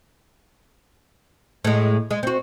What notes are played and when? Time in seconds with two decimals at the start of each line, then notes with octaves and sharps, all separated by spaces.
1.64 A2 G#3
2.11 G#3
2.23 C4 F#4